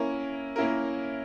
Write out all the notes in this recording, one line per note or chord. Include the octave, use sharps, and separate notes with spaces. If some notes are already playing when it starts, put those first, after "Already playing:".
Already playing: A#3 C#4 E4 A#4
A#3 C#4 E4 A#4